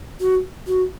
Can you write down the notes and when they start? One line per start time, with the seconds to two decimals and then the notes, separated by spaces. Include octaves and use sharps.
0.20 F#4
0.67 F#4